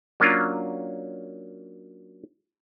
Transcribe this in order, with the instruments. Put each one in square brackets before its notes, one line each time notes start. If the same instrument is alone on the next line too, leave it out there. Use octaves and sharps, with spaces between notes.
[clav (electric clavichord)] F#3 A#3 C#4 D4 F4